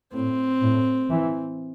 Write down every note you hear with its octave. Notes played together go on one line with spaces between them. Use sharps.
A2 C4
A2
E3